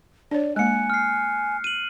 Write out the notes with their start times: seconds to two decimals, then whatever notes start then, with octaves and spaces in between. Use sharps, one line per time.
0.31 D4 C#5 D5
0.56 G#3 A#3 G#5 F#6 C#7
0.90 F6 C7
1.64 D#7 F#7